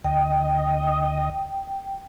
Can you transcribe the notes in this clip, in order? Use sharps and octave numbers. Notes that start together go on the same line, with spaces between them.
D2 D#5 G5